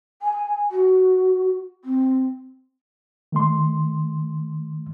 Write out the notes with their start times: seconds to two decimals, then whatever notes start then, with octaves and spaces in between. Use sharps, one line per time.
0.22 G#5
0.71 F#4
1.85 C4
3.32 D#3 A3 C6